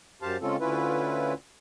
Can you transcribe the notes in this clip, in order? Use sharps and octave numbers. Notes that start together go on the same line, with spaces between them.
F#2 G4 C5 F5 A5
C#3 G#3 C4 C#4 F4 A4
D2 C#4 E4 F4 B4